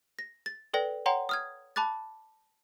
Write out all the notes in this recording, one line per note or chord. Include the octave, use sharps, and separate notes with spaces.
A#6
A6
A4 B4 D5 G5 A#6
C#5 F#5 G5 A#5 C6
D#6 F6 G#6
A5 B5 D6 F#6 A6